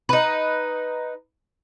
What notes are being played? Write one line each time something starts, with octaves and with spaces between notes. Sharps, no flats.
D#4 B4